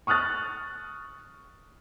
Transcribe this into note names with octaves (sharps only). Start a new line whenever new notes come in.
C#6 D#6 F6 F#6 A6